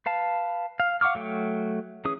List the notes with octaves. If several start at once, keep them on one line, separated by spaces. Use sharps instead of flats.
B4 F5 A5
F5
F5 F#5 C#6 D6 F6
F#3 A3 G5
E3 C#4 G#4 D#6